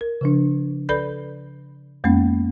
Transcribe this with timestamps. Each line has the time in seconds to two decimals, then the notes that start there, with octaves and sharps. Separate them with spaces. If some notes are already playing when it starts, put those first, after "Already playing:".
0.01 A#4
0.21 C#3 F3 D4
0.89 A4 B4 D5 B5 G6
2.04 F2 G#3 A#3 B3 C#4